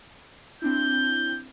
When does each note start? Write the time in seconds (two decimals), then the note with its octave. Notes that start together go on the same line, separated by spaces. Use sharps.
0.62 C4 D4 E4 G6